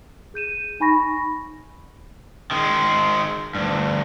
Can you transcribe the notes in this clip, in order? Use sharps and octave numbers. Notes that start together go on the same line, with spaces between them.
G#4 G6 D#7 E7
D#4 G#5 B5 C#6 A#6
D#3 G#3
D2 G2